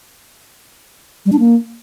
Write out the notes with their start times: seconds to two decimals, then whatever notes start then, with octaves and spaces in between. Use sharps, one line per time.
1.26 G3
1.32 D4
1.39 A#3